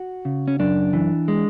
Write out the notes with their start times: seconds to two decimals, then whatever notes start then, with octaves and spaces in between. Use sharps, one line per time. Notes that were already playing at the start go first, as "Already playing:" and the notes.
Already playing: F#4
0.25 C#3
0.48 C#4
0.60 F#2 D4
0.93 E3
1.28 G#3